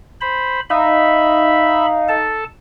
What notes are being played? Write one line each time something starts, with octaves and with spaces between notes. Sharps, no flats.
C5 B5
D#4 E5 F5 B5
A4 A5